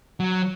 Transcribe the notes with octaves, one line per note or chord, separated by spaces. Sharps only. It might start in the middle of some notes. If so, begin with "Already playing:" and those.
F#3